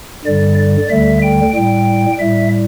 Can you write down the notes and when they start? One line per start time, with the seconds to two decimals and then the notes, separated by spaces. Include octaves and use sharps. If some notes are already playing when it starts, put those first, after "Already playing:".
0.25 G2 D3 G3 D5
0.58 D5
0.89 D2 D3 G3 E5
1.22 G5
1.55 A2 G3 G5
2.19 A2 G3 E5